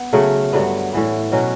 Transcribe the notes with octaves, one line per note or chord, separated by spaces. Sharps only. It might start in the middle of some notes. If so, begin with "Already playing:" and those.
Already playing: B3
C#3 F#3 A3
G2 D3 F#3 B3
A2 E3 B3
B2 F#3 C#4 F#4